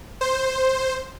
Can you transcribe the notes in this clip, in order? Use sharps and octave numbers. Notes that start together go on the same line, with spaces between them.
C5